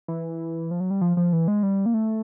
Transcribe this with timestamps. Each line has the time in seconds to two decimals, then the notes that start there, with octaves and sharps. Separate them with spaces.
0.08 E3
0.71 F3
0.80 F#3
0.90 G3
1.01 F3
1.17 F3
1.33 E3
1.48 G#3
1.63 G3
1.86 A#3
1.94 A3